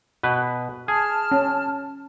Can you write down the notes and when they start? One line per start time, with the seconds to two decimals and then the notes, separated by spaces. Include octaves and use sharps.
0.23 B2 B4
0.88 G#4 A5 F6
1.31 C#4